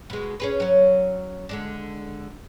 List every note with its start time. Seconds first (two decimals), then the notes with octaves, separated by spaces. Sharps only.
0.10 B2 G#3
0.40 C#4 G#4 B4
0.60 F#3 C#4
1.49 D3 G#3 D4